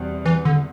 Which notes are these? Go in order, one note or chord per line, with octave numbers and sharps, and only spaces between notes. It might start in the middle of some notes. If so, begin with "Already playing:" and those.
Already playing: E2 B2 G3 C4
E3
D3